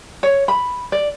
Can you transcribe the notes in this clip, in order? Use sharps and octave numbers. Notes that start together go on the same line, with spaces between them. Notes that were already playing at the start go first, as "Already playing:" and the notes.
C#5
B5
D5